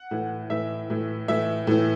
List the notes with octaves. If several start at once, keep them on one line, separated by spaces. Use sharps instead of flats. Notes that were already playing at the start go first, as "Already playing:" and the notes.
Already playing: F#5
A2 E3
A2 E3 E5
A2 E3
A2 E3 E5
A2 E3